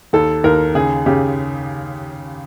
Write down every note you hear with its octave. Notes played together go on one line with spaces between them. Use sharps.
D#2 A4
D#2 A#4
C#3 G#4
C#3 G4